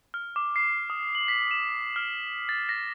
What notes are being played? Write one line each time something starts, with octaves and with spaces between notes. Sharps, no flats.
F6
D6
C7
D#6
F#7
B6
E7
F6
A6
A#6